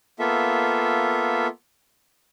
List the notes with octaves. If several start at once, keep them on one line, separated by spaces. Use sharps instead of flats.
A#3 B3 F4 A4 E5